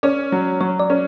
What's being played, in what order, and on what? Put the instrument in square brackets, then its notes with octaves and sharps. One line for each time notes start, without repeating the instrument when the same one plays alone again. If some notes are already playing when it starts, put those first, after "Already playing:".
[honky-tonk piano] C#4 [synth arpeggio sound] D5
[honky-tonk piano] F#3
[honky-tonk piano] F#3 [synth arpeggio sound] C#5
[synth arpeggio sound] D5
[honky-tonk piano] C#4